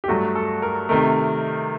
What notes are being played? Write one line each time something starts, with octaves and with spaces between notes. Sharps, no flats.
G4
G2 F#3 A3 F#4
A4
A#4
C3 D#3 A3 A#4